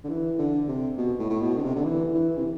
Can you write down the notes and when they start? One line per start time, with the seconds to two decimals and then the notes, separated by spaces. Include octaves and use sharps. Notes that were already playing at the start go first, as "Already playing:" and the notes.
0.04 D3
0.09 E3
0.39 D3
0.68 C3
0.98 B2
1.19 A2
1.30 A2
1.41 B2
1.58 D3
1.63 C3
1.75 D3
1.85 E3
2.15 E3
2.37 C3